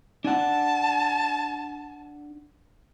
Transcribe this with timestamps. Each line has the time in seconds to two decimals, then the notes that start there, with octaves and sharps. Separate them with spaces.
0.24 D4 F#5 A5